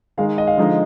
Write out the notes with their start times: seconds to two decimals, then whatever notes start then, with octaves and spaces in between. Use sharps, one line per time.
0.17 D#3 G#3 D#4 F5
0.38 D#5
0.47 F5
0.57 D3 F3 G#3 D#4